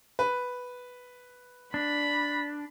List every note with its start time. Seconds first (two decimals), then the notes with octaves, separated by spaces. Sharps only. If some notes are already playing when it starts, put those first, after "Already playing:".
0.19 B4
1.74 D4 B5